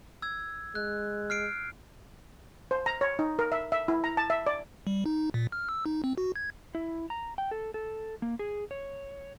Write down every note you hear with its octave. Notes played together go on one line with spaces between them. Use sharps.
E6 G#6
G#3 F#6
F6 C7 D7
C5
A#5
C#5
D#4
A#4
E5
E5
E4
A#5
A5
E5
D5
G3
D#4
A#2
F6
E6
D#4
C4
F#4
G#6
E4
A#5
G5
A4
A4
A#3
G#4
C#5